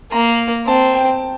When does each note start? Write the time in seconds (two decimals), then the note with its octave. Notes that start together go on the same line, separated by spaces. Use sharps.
0.12 A#3 A#5
0.67 C4 A5
0.94 G5